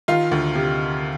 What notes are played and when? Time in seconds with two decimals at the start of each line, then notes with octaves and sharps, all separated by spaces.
0.08 D#3 F4 F5
0.31 D2
0.55 C3